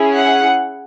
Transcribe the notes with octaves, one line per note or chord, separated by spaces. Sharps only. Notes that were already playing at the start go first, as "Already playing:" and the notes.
Already playing: C#4 E4 G#4
F#5